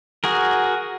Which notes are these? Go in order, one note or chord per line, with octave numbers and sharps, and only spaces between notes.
F#4 G#4 A#4